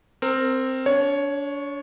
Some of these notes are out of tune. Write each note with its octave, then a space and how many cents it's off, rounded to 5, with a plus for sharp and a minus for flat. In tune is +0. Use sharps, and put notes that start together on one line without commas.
C4 +0 A#4 -20
D4 -35 C#5 +0